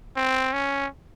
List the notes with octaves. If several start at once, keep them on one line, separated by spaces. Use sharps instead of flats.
C4
C#4